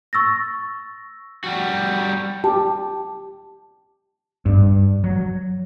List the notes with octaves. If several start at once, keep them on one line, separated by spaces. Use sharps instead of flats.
C#6 E6 A6 A#6
G3 F#4
G4 A5
G2
F#3